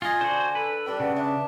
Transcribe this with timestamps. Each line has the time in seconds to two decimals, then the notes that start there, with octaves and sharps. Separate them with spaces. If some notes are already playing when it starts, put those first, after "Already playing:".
0.02 F4 D#5 G#5
0.21 D3 F#4 C5
0.55 A4 B4
0.86 G3 D4 B4 G5
1.00 C#3 F#5
1.16 D4 E5